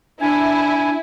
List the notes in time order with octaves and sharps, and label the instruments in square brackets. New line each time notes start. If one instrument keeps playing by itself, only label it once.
[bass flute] D4 [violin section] E4 [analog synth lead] G#5